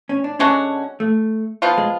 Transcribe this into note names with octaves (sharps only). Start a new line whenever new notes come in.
C#4
D4
D3 G#3 C#4 D4 F#4
A3
F3 B3 F4
G#3